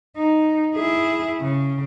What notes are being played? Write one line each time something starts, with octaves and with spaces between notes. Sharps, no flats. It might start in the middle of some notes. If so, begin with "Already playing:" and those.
D#4
E4 G#4
C#3